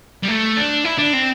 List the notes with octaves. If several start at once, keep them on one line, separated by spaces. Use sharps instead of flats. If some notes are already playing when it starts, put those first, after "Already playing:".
G3
A3
D4
E4
D4
C4